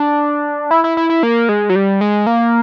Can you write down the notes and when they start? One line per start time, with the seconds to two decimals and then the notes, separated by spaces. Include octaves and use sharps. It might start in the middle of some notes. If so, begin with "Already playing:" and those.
Already playing: D4
0.71 E4
0.84 E4
0.97 E4
1.10 E4
1.23 A#3
1.49 G#3
1.69 F#3
1.75 G3
2.01 G#3
2.27 A#3